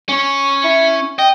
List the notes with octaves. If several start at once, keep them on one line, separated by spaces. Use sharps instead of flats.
C#4 C#5
E4
D#5 G5